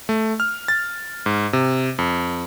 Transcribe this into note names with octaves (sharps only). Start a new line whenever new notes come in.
A3
F6
A6
G#2
C3
F2